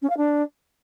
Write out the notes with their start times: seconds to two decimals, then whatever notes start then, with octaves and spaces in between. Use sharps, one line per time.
0.02 C#4
0.09 F5
0.17 D4